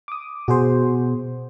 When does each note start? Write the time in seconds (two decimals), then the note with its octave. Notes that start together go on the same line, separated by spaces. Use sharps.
0.08 D6 D#6
0.48 B2 F#4 G#4 C5